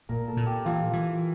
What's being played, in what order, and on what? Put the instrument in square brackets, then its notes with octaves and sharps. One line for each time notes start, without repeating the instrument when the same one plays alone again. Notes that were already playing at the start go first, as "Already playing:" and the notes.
[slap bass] A#2 [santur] A#4
[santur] A4
[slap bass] A#2
[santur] G4
[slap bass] E3 [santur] F4
[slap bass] E3